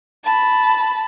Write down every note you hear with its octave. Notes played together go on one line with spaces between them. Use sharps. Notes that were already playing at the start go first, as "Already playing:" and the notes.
A5 B5